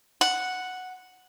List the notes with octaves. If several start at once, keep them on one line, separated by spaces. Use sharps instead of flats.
F#5